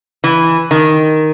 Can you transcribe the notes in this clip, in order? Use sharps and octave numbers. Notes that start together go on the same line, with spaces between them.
E3
D#3